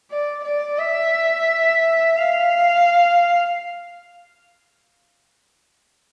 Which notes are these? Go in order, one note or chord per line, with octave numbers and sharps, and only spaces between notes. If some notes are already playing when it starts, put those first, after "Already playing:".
D5
D5
E5
F5